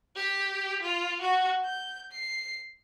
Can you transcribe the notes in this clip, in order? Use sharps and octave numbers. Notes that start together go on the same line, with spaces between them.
G4
F4
F#4
G6
C7